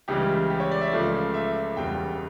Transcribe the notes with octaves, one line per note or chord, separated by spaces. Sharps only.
C#2 C#3 E3 G3 G4
G4
C#5
D5
E5
C#2 C#3 F3 A3 D5
E5
E1 E2 C#3 G3 G5